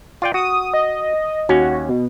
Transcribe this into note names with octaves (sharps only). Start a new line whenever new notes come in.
F4 D5 G5
F#4 D#6
D#5
D#2 C#4 F#4
B2